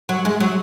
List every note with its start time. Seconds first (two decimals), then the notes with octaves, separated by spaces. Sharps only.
0.09 F#3
0.25 G#3
0.40 F#3